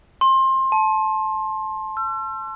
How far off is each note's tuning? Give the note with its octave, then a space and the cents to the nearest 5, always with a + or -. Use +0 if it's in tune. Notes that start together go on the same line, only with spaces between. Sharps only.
C6 +25
A5 -20
E6 +45